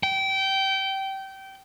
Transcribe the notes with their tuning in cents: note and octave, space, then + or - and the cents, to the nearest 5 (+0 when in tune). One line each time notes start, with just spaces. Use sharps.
G5 -20